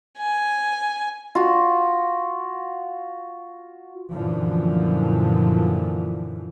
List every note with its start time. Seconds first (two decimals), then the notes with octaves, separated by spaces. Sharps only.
0.18 G#5
1.35 F4 F#4
4.12 F#2 A#2 D3 E3 F3